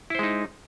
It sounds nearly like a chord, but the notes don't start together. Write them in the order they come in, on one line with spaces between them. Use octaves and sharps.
E4 C5 G#3 D#4